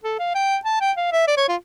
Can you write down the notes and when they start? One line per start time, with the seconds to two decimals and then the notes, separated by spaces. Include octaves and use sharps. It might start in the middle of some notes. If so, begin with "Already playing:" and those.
0.04 A4
0.19 F5
0.35 G5
0.65 A5
0.81 G5
0.97 F5
1.12 E5
1.28 D5
1.37 C#5
1.49 F4